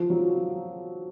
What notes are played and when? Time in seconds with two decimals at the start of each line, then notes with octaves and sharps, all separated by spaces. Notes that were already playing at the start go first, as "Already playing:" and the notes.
Already playing: F3
0.10 F#3